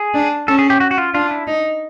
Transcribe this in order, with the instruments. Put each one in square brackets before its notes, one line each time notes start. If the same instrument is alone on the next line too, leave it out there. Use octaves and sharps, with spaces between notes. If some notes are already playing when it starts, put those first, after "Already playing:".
Already playing: [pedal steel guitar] G#4
[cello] D4
[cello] C#4 [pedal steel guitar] A4
[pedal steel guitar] G#4
G4
F#4
F#4
F4
[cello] D4 [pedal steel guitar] F4
[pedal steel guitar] E4
[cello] D#4